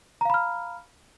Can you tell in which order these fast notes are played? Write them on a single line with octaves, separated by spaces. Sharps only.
A#5 F5 B5 F6